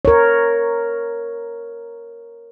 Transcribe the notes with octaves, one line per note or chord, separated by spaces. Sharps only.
A#4 C#5